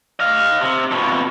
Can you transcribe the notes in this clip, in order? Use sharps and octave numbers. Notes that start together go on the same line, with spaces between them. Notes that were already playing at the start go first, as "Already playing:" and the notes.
D#5 F5
C3
F2 B2